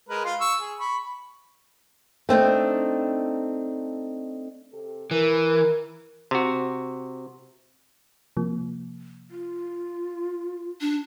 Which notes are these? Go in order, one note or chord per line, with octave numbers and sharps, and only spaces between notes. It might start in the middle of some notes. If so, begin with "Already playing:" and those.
G#3 A#4 B4
F4 C6
C#6 E6
G#4
B5 C#6
A3 C4 D4 D#4
C3 G4 A4
E3 A#4
C3 F#4
C3 F3 A#3
F4
D4